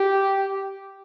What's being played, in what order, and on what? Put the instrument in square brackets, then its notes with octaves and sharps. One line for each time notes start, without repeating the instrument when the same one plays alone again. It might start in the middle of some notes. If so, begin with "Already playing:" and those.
Already playing: [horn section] G4